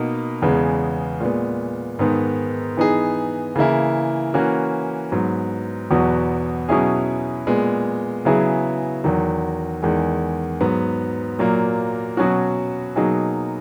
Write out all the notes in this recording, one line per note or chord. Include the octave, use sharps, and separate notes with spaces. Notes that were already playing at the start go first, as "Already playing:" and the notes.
Already playing: B2 A#3 D#4
E2 C#3 G#3 B3
A#2 G#3 B3
G#2 D#3 G#3 B3
E3 B3 D#4 G#4
C#3 E3 A#3 E4
E3 A#3 C#4 F#4
G#2 F#3 B3
E2 B2 F#3 B3 F#4
B2 F#3 C#4 E4 G#4
A#2 G#3 B3
C#3 F#3 B3 E4 G#4
E2 D#3 F#3
E2 D#3 G#3
G#2 F#3 B3
A#2 F#3 A#3
B2 F#3 C#4 F#4
B2 F#3 A#3 D#4 G#4